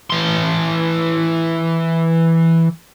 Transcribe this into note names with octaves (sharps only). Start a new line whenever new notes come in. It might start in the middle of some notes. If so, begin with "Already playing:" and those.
E3 C6